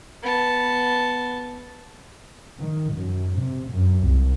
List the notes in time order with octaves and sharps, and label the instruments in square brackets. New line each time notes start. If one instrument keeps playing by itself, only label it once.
[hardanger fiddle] B3 A5
[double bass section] D#3
F#2
C3
F#2
C2